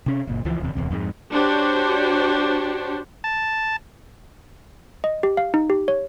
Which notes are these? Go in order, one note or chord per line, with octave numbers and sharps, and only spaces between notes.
C3 C#4
F#1 A#2
C#2 E3 F3
D1 E2 C3
D1 A1 E2 C3
F2 G#2 C#3 G#3
D4 F#4 G4 C5 C#5
A5
D#5
G4
F5
D#4
G4
C#5